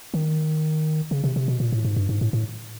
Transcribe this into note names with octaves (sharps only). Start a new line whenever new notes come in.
D#3
C#3
C3
C3
B2
A#2
A2
G#2
G2
G#2
A2
A2